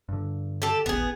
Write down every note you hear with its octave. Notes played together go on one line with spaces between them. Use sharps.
G2 D3
G4 A4
D#1 A1 B3 G#4